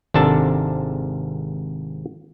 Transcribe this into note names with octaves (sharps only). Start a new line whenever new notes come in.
G#1 G#2 C3 D4 A4 A5